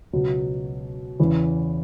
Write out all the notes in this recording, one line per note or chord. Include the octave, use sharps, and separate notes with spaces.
C#2 B2 F#3
E2 C#3 E3